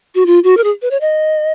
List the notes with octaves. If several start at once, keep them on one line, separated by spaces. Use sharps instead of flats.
F#4
F4
F#4
A#4
G#4
B4
C#5
D#5